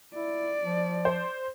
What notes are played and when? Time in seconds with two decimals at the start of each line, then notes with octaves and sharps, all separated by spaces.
0.14 E4 D5
0.62 F3
1.05 C5